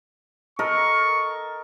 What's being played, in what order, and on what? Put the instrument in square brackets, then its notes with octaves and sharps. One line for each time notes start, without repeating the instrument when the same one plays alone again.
[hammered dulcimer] A4 A#4 D#5 [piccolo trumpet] C#6